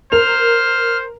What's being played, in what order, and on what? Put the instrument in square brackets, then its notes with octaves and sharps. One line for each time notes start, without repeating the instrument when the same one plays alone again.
[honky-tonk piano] A#4 F7 [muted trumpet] C5 [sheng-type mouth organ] F6